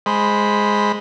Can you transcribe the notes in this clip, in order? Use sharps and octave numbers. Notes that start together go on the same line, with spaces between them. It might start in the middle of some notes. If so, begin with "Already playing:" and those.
G#3 C5 B5